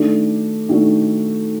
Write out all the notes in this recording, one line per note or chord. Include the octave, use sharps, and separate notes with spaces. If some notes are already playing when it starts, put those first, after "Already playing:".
Already playing: D#3 A3 D4 F#4
D#3 A3 D4 F#4